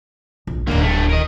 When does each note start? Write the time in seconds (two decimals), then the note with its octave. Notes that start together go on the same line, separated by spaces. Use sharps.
0.47 A#1
0.67 D1 G#1 D3 A#3
0.82 G2 A3
1.09 A#4 D#5